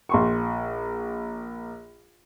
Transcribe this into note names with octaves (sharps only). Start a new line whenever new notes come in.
A#1 C6 C#6